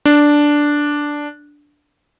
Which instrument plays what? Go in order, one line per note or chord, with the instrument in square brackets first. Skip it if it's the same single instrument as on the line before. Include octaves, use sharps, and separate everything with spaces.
[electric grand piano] D4